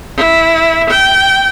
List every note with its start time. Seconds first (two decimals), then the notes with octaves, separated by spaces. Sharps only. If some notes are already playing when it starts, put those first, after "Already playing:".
0.17 E4
0.89 G5